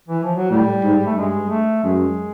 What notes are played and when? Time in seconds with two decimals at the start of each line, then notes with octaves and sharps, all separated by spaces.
0.08 E3
0.23 F3
0.36 F#3
0.50 A2 G3
0.84 G#2
1.06 A3
1.16 G2 G#3
1.50 A3
1.84 F#2 G#3